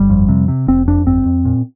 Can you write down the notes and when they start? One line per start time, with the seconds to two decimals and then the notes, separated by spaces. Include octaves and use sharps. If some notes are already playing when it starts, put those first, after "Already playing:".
Already playing: G1 G3
0.10 F2
0.29 C3
0.48 C3
0.68 F1 C4
0.87 F2 D4
1.06 G1 C4
1.26 F2
1.45 A#2